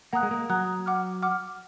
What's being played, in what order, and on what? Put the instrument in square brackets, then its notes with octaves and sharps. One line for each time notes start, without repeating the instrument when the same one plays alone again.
[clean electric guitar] A#3 [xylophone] F#5 A#5 D#6 F#6
[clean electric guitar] G#3
A#3
[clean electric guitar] F#3 [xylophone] F#5 A#5 D#6 F#6
[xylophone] F#5 D6 F6
F#5 D6 F6